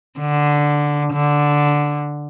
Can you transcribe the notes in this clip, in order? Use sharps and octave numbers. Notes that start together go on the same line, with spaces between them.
D3
D3